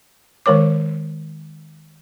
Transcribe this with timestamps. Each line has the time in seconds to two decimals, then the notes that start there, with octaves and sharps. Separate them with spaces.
0.46 D#3 G#3 A#4 C#5 D6